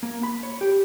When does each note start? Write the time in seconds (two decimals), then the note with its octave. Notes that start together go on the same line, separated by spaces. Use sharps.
0.03 A#3
0.23 B5
0.43 C#5
0.61 G4